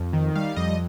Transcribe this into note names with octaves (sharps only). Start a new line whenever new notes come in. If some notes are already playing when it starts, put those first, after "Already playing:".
Already playing: F2
D#3
G3 F5
F2 D#5